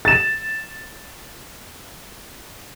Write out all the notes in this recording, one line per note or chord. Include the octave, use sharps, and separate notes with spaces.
A6 E7